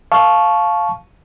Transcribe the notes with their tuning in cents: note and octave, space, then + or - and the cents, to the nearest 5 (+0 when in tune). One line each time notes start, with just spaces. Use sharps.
F5 +0 A5 -20 C#6 +0